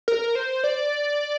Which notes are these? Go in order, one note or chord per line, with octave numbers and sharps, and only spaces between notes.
A#4
C5
D5